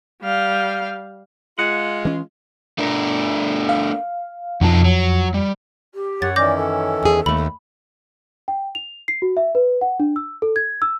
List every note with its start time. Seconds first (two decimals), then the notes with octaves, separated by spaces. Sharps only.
0.22 G3 F5
1.59 G#3 F4 F#5
2.05 E3 C#4
2.78 A3 D4 A#4
3.69 F5
4.61 F2 B2 F3 D#4 A5
4.84 F#3
5.34 G3
5.94 G4
6.22 F#2 C#5 F#5 A6
6.36 D#3 E3 C#4 D5 D6 G6 A#6
6.56 A4
7.03 E2 G#4
7.26 D#2 A3 B5
8.48 G5
8.75 F7
9.08 C7
9.22 F#4
9.37 E5
9.55 B4
9.81 F#5
10.00 D4
10.16 E6
10.42 A4
10.56 G#6
10.82 E6